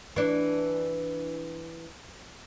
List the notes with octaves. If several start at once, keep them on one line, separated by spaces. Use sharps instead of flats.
E3 D4